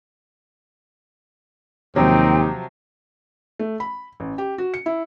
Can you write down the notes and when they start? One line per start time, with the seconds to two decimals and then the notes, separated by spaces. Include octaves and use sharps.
1.96 D#2 C3 F3 F#3 C4 D#4 G4 G5
3.59 A3
3.80 B5
4.20 A1
4.38 G4
4.58 F#4
4.74 C#7
4.86 E4